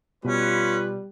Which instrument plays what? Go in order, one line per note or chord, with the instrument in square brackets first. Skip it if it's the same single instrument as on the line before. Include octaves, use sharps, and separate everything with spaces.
[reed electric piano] B2 [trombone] G3 [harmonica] C#4 [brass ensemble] F4 B4